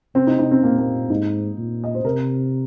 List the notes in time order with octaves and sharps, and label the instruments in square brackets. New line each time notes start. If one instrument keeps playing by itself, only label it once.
[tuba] C3 [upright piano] C4
[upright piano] D#4
D#4
C4
[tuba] A#2 [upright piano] A#3
[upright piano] A#3
[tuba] G#2 [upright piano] D#4
[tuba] A#2
[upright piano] D#5
C5
[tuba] C3 [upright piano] A#4